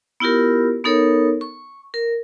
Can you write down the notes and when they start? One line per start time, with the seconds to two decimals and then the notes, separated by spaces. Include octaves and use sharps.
0.20 B3 E4 F4 G4 A#4
0.84 B3 D#4 A4 A#4 C#5
1.41 C#6
1.94 A#4